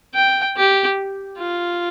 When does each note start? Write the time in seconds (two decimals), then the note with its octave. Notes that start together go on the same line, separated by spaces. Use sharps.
0.14 G5
0.57 G4
1.39 F4